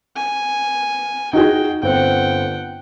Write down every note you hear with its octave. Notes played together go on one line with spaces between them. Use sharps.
G#5
D#4 F#4 G#4 G5
G1 C4 F#5 G5